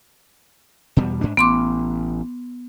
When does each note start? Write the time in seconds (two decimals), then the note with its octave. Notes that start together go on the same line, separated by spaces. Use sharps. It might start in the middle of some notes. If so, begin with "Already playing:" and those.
0.97 E2 B2 G3
1.21 G#2 D4
1.37 A1 B3 C6 D6